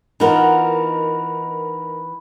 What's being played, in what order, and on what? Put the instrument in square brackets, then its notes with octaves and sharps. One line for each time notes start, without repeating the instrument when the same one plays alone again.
[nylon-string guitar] E3 B3 F4 [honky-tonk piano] D#4 A#4 [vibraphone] B5